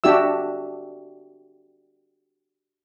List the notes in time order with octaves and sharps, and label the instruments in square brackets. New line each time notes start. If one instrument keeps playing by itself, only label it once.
[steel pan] D4 F#4 G4 E5 E6